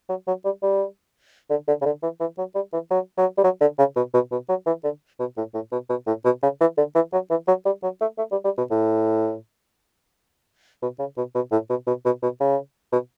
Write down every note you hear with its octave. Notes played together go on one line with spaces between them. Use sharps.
F#3
F#3
G3
G3
D3
D3
C#3
D3
E3
E3
F#3
G3
E3
F#3
F#3
G3
F#3
D3
C#3
B2
B2
B2
F#3
E3
D3
B2
A2
A2
B2
B2
A2
B2
C#3
E3
D3
E3
F#3
E3
F#3
G3
F#3
A3
A3
G3
G3
B2
A2
B2
C#3
B2
B2
A2
B2
B2
B2
B2
C#3
B2